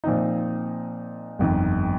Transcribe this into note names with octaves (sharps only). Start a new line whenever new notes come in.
A#2 F3 C4 D#4
G1 F2 D#3